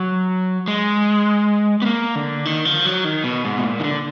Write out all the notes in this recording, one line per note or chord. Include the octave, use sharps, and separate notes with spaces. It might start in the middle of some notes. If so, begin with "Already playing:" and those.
Already playing: F#3
G#3
B3
A#3
D3
D#3
F3
F#3
D#3
B2
G#2
B2
A#2
D#3
D3